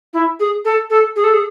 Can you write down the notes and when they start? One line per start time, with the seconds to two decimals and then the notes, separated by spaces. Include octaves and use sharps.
0.13 E4
0.39 G#4
0.65 A4
0.90 A4
1.16 G#4
1.24 A4
1.33 G#4